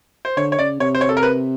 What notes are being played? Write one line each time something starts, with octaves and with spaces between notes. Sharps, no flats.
C5
D3 C#5
C#5
C#3 D5
C3 C#5
C5
C#5
A4
A#4
B4